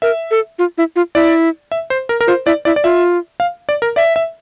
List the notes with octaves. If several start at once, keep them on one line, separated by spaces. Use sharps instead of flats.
A#4 E5
A4
F4
E4
F4
E4 D5
E5
C5
A#4
A#4
F4 C5
E4 D5
E4 D5
D5
F4 E5
F5
D5
A#4
D5 E5
E5